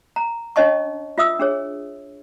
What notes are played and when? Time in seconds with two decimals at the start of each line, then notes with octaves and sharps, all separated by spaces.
0.16 A#5
0.56 C#4 D4 C#5 D#5 A5 C#6
1.18 F4 E5 D#6 E6
1.40 D4 G#4 C#5